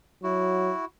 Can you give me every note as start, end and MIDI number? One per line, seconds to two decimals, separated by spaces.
0.24 0.72 54
0.24 0.85 64
0.24 0.85 66